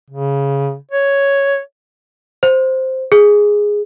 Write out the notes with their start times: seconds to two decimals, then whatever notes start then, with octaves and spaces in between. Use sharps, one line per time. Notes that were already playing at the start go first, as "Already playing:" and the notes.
0.10 C#3
0.91 C#5
2.43 C5
3.12 G#4